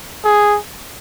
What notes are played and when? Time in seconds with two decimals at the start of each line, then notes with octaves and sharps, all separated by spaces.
0.25 G#4